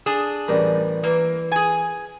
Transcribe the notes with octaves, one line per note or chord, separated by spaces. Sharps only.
D4 G#4
A1 G3 A#4
E3 A#3
G#4 G#5